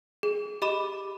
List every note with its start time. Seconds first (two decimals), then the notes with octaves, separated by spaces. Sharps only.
0.23 G#4
0.62 G4 D#5 B5 D6 E7